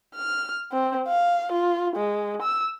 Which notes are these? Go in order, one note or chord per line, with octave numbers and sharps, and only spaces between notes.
F6
C4
F5
F4
G#3
E6